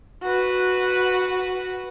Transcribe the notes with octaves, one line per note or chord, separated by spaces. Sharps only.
F#4 B4